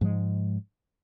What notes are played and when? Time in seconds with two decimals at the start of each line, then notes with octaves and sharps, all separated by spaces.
0.01 G#2 F3 G#3